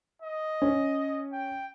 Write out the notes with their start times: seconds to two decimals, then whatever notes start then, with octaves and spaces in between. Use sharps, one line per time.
0.22 D#5
0.62 C#4
1.32 G5